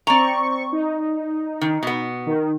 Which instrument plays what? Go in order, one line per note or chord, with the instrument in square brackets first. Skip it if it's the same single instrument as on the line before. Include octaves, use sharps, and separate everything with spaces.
[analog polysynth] C4 C#6 [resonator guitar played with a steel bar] D5 A#5
[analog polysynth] D#4
[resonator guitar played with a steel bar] D#3
B2 B3
[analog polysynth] D#3